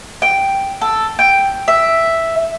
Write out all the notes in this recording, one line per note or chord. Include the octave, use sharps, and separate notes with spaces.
G5
A4
G5
E5